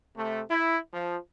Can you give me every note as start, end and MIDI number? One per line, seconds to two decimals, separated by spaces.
0.16 0.40 48
0.16 0.40 57
0.50 0.77 64
0.92 1.16 53